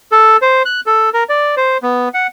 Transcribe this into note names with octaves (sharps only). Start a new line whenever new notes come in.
A4
C5
F#6
A4
A#4
D5
C5
B3
F#5